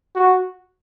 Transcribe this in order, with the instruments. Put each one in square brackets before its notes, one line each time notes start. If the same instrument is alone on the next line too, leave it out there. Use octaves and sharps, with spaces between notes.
[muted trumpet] F#4